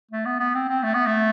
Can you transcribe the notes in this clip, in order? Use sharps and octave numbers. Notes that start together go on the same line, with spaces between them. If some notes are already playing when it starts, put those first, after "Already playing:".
A3
B3
B3
C4
C4
A3
B3
A3